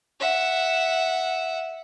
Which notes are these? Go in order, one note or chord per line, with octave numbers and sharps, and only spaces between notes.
E5 F#5